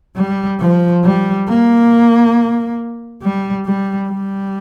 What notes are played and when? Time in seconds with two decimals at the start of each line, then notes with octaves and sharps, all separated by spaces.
0.16 G3
0.60 F3
1.04 G3
1.48 A#3
3.23 G3
3.66 G3
4.09 G3